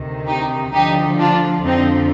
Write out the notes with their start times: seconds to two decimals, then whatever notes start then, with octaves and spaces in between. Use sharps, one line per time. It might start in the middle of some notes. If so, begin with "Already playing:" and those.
Already playing: D2 C3 D#3
0.27 D#4 G4
0.73 D2 D3 F3 D#4 G4
1.19 D4 F4
1.65 F2 D3 F3 C4 D#4